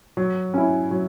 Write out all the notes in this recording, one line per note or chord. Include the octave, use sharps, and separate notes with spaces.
F#3
C#4 E4
F#3